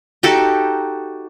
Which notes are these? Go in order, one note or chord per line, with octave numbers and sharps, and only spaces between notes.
D#4 F#4 G4 A4